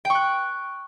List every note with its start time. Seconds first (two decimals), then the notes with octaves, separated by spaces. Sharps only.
0.05 G5
0.10 C#6
0.15 F#6